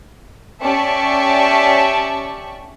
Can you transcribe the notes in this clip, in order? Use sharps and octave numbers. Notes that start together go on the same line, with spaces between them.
C#4 G4 D5 E5 A5 C#6